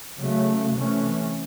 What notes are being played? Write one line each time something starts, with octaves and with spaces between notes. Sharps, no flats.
C#3 F#3 A3
C3 E3 A3 C#4